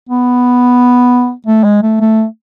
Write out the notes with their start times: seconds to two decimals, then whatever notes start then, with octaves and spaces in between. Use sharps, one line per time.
0.09 B3
1.46 A3
1.64 G#3
1.83 A3
2.00 A3